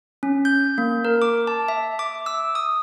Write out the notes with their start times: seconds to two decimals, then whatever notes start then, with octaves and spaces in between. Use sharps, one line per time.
0.23 C#4
0.45 G6
0.78 A#3
1.05 A#4
1.22 D6
1.47 A5
1.68 E5
1.99 D6
2.26 E6
2.55 D#6